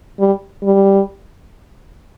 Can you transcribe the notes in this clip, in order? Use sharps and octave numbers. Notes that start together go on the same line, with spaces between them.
G3
G3